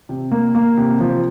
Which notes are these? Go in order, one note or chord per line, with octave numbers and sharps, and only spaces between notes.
C3
A#3
A#3
C3
F3